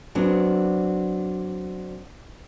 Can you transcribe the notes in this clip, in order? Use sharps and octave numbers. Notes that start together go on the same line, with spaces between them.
F#3 B3 C4 D4 F#4